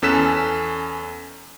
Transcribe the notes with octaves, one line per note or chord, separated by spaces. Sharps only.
E2 C#4 A4 F#6 B6 E7